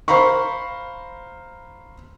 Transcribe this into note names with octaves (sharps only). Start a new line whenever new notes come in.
C5 F5 A#5 B5 C#6